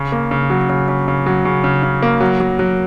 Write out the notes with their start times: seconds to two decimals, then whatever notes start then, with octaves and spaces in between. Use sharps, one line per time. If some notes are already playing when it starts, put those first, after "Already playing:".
Already playing: C#3
0.12 A#3
0.31 C#3
0.50 F#3
0.69 C#3
0.88 C#3
1.08 C#3
1.26 F#3
1.45 C#3
1.64 C#3
1.83 C#3
2.03 A#3
2.20 F#3
2.40 F#3
2.59 F#3